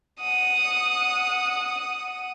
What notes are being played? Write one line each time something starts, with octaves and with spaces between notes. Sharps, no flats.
F#5 D#6